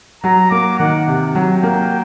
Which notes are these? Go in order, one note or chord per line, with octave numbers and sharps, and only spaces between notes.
F#3 A#5
A#3 D6
D#3 F#5
C3
F#3
G5
A#3